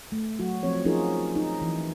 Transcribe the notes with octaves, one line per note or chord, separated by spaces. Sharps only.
A3
F#3 F#4
F3 C4 C#5
F3 C#4 D#4 F4 G#4 A#4
D#4
E3